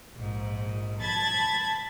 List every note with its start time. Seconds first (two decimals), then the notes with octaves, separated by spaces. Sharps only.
0.13 A#1 G#2
1.01 A5 B5 G#6 A6